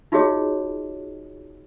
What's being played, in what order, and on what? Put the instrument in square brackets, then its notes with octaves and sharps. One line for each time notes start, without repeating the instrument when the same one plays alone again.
[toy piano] D#4 F4 F#4 G#4 C#5 D#5